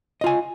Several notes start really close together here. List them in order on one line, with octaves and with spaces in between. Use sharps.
D#5 F4 G#5